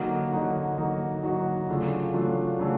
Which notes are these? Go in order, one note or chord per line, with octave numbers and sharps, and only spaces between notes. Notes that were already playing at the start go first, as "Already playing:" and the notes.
Already playing: D3 F#3 A#3 D#4 F#4
D3 F#3 A#3 D#4 F#4
D3 F#3 A#3 D#4 F#4
D3 F#3 A#3 D#4 F#4
C#3 F#3 A3 D4 F4
C#3 F#3 A3 D4 F4
C#3 F#3 A3 D4